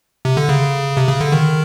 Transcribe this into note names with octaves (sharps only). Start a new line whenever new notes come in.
C3
D3
C#3
C3
C#3
D3
D#3